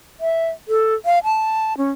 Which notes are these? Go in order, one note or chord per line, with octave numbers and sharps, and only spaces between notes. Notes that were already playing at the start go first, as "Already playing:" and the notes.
E5
A4
F5
A5
C#4